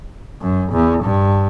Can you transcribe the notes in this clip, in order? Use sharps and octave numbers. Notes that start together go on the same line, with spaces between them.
F#2
E2
G2